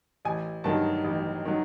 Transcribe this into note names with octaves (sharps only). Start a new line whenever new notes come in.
A1 G#5
G2 D#3 F#3 A5
A1
D#3 F#3